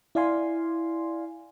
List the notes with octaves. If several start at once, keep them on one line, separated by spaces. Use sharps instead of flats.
E4 D5 F5 G#5 C6